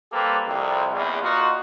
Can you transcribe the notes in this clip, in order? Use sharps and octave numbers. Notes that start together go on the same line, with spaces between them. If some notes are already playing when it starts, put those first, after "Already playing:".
G3 A#3 C4 G4 A4 B4
C2 F2
A#1 E2
A#2 D#4 F4 F#4